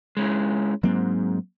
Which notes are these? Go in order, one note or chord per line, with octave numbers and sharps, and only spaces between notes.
G#3 C#4 E4
G#2 F#3 A#3 C4